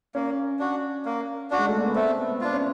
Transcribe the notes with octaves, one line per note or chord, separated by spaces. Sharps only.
A#3 C#4
D4 F#4
A#3
D4 F#4
G#3
A3
A#3
B3
A3 C4
B3
D4 F4
C#4